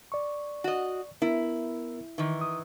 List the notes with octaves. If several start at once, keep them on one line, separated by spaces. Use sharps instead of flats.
D5 C#6
F#4 D#5
B3 E4 A#4
D#3 E3
D#6